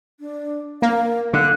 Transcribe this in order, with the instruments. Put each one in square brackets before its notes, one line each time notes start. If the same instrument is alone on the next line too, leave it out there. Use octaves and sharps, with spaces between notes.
[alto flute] D4
[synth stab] A#3 [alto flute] F5
[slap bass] D3 [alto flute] F5 [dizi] F#6